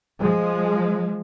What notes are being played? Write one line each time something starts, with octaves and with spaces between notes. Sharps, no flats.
F3 G#3